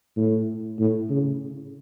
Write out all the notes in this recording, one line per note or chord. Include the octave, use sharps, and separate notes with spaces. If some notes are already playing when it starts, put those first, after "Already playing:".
A2
A2
C#3